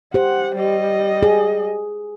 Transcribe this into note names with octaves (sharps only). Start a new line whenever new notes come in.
G4 C5 F#5
G3 D#5
G#4